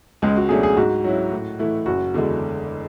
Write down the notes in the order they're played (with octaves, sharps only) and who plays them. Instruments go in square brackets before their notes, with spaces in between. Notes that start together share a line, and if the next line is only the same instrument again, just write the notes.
[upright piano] C#2 [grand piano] G#3
[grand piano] F#4
[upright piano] B2 F#3 A3 D4 [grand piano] G#4
[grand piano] G#4
[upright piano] G#2 [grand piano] F#4
[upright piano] F#3 C#4 E4
A2
E3 A3 E4
[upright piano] F#1 [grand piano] F#4
[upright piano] E2 D3 G#3